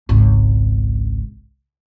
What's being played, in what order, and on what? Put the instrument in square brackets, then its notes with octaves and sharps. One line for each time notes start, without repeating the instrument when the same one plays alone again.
[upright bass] G#1 C#2